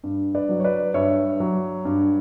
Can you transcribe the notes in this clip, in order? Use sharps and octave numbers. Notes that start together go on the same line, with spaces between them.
G2
B4 D5
F#3
C#5
B4 D5
G2 C#5 E5
F#3
G2